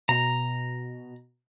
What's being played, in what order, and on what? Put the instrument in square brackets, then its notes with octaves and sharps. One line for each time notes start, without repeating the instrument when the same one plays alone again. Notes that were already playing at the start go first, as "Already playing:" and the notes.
[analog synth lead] B2 [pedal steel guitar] A#5